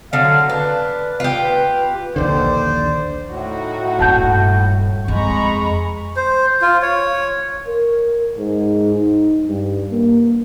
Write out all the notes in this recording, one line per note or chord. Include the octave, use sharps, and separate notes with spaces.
D3 F#3 F5
D4 B4
F4 G4
B4
A#1 D#2 D3 C5 D5
A2 D#4 F#4
D#1 G2 F#5 A5 G6
F2 G#3 A#5 B5 C#6
C5
F4
C#5
A#4
G#2
D#4
G2
A#3